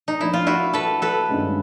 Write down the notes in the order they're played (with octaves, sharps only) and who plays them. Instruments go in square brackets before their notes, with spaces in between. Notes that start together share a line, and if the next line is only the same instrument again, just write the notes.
[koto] D#4
[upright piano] F3 A#3 D4 [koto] E4
[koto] F4
E4 F#4
A4 B4
A4 B4
[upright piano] G2 D#3 G#3 C#4